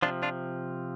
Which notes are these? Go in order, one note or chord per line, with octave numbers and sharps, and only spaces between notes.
C3 F3 D4 F4
D4 F4